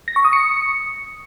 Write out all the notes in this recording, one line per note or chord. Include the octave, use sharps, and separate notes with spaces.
A#6
C#6
D#6
C#7